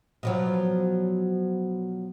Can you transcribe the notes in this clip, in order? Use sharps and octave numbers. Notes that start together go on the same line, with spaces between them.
B2 F3 F#3